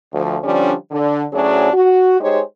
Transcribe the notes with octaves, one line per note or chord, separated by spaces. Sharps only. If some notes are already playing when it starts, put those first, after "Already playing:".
D2 F3
D3 F3 G3 C#4 D4
D3
D2 A2 F#3 C#4 D4 G#4
F#4
G#3 D#4 G4 G#4 C5 C#5